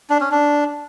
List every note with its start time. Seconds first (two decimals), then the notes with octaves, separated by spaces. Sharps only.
0.10 D4
0.21 C#4
0.32 D4